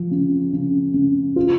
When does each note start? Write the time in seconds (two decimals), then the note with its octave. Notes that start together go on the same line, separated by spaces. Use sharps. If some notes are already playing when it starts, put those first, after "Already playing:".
Already playing: F3
0.11 C#3
0.53 C#3
0.94 C#3
1.36 F4